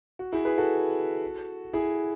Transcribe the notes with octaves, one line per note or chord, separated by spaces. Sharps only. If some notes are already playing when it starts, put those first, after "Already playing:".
F#4
E4 G#4
G#4 B4
F#4 A4
E4 G#4